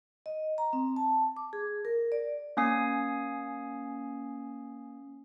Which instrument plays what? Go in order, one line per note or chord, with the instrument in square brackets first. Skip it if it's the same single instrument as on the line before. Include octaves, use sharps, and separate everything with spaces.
[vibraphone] D#5
A#5
C4
A5
D6
G#4
A#4
D5
[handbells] A#3 C#4 G#5 D#6 C7